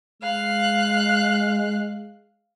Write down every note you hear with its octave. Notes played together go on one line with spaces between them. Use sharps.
G#3 F5 F#6